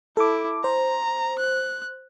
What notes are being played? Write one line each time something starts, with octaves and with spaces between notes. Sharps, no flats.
E4 A4 D6
C5 A#5
F#6